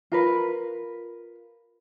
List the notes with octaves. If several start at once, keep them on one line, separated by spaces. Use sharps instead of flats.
F4 A#4 B4